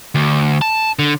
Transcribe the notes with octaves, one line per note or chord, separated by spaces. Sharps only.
D2
A5
D3